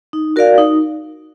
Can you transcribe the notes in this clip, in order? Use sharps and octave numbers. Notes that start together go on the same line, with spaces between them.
D#4
F#4 A#4 D5 F5
D#4